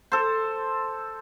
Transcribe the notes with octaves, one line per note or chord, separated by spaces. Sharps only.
A4 C5